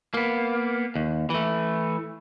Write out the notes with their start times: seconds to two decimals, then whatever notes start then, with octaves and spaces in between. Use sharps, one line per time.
0.14 A#3 B3
0.95 D#2
1.30 E3 A3